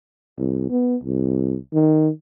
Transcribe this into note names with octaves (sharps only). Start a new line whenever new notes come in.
C2
B3
C2
D#3